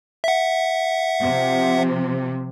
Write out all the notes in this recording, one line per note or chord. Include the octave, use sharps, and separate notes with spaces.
E5 F#5
C3 F3